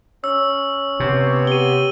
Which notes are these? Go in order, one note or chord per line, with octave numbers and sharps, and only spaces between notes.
C#4 E6
C3 B3 C#5
G4 D#7 G7